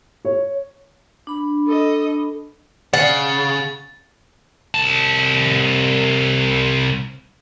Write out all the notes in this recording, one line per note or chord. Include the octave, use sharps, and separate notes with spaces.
C#5
D4 B5
A4 D#5
C#3 F#5 A6
C2 A5